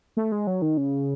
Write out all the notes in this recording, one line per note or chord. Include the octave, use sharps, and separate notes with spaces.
A3
G#3
F#3
D#3
C#3